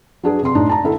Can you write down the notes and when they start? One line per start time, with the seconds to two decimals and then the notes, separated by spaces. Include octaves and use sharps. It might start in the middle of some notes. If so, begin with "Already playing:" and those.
0.23 F#3 D4 G#4 B4
0.43 C3 C6
0.55 A2 D4 D#4
0.69 A5 A#5
0.84 D3 B3 E4 A4